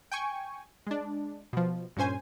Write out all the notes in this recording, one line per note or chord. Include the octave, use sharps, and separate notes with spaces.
G5 G#5 C#6
G#3 D4
B2 F3
G2 A#2 C#4 C5 G#5